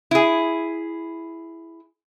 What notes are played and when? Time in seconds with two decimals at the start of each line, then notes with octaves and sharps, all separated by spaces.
0.11 E4 G#4